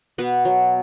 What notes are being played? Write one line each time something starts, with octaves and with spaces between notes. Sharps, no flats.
B2 B3 B4
F#3